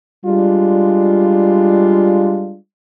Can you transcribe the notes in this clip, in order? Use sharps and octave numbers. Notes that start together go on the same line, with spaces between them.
G3 G#3 D4 F4